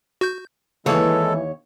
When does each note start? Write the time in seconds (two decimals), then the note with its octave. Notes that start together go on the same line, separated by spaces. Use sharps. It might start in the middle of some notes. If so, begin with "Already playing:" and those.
0.21 F#4 G6
0.86 D#2 C#3 E3 G#3 A#3 A4 C#5